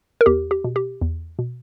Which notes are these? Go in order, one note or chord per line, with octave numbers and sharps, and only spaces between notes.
A#4
E2 G4
G4
B2
G4
E2
B2